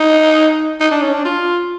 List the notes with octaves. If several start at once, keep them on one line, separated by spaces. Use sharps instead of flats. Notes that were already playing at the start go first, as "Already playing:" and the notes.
Already playing: D#4
D#4
D4
C#4
D4
F4